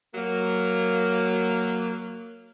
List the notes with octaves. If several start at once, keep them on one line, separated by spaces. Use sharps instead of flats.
F#3 A#3